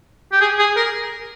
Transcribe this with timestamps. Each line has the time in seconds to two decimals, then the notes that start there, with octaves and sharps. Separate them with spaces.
0.32 G4
0.40 G#4
0.59 G#4
0.76 A#4